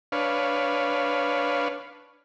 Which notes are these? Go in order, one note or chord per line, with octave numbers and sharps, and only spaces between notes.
D4 B4 C#5 F5